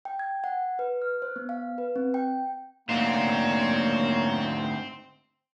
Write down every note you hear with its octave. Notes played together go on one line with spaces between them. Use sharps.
G5
G#6
F#5
B4
F6
C5
B3
F5
B4
C4
G5
D2 G#2 A#3 C4 C#5 A#5